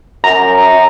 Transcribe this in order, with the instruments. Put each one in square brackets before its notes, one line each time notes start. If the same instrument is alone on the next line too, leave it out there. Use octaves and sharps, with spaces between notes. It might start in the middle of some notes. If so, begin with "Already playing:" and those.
[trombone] F#2 [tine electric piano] A#5